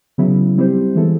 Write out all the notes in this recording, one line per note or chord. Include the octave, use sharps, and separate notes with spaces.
C#3 F#3 B3 E4
G3 C4 E4 G4 C5
E3 G#3 B3 E4 A4